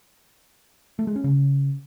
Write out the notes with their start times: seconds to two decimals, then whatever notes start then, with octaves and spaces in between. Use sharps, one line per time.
0.99 A3
1.07 G#3
1.16 C#4
1.24 C#3